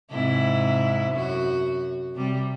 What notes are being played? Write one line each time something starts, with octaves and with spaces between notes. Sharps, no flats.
G#2 C3 E4
F#2 F#4
C3 G3